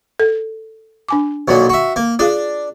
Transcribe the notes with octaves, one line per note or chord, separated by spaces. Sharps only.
A4
D4 G#5 D6
B1 A#2 F#3
F#4 E5
A#3
D4 F4 G#4 F5